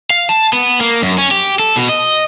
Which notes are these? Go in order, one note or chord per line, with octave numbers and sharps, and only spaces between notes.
F5
A5
B3
A#3
F#2
C#4
G4
A4
B2
D#5